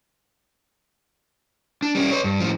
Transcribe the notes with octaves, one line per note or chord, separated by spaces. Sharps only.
D4
G3 C#4
B4 C#5
G2
A2 F3